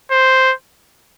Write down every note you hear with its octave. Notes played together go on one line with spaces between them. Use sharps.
C5